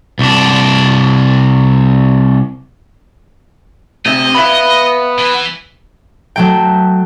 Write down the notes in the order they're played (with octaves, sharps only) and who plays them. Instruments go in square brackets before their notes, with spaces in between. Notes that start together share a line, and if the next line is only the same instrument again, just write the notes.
[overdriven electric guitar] C2 D4
[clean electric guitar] D2 [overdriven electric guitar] C3 E5 [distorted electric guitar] D#5
[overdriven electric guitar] B3 [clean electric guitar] E5 F5 B5
[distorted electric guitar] E3 E4
[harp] F#3 A3 G5